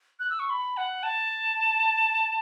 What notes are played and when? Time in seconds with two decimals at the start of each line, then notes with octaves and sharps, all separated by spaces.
0.20 F#6
0.30 E6
0.39 C#6
0.50 B5
0.77 F#5
1.03 A5